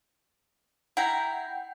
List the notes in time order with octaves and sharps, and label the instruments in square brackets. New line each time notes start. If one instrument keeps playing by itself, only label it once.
[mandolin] E4 A#5 [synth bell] F#5 G5 G6